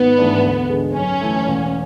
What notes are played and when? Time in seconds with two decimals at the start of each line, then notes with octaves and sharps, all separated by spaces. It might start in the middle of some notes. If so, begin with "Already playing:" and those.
Already playing: G#1 B3
0.18 G#2 E3 A3 D4
0.43 D2
0.69 D3 G#3
0.95 F#2 C#4
1.21 E3 A3
1.47 E1